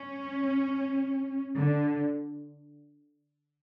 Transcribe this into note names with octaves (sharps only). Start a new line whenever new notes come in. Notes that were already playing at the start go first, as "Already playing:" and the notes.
Already playing: C#4
D3